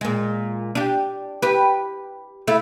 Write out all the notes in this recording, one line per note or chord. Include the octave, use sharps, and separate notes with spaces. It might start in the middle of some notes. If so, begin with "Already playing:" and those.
A#2 G#3
D4 G4
G4 B4
A3 E4